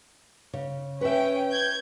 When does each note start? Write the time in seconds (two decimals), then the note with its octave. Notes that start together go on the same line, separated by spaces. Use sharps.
0.53 C#3 C#5
1.01 C#4 B4 E5 G5
1.49 G6 G#6